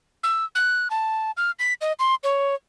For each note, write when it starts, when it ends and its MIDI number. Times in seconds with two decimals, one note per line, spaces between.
0.23 0.45 88
0.55 0.88 90
0.90 1.31 81
1.37 1.51 89
1.59 1.73 95
1.81 1.92 75
1.99 2.15 84
2.24 2.55 73